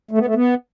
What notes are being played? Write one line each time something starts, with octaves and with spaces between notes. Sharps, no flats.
A3
B3
A3
B3